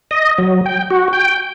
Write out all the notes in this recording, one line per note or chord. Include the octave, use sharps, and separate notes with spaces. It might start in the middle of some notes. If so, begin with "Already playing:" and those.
D#5
F#3
G5
F#4
G5